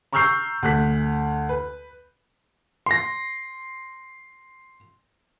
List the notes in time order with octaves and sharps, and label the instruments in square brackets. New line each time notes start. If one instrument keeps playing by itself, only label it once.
[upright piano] A#5 C#6 E6 F6 G6 C7
D2 F#6 B6
B4
[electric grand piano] C6 A#6